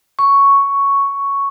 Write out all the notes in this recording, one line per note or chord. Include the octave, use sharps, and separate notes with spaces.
C#6